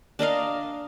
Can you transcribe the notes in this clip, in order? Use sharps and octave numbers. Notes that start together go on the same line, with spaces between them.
D4 A#4 D#5 F5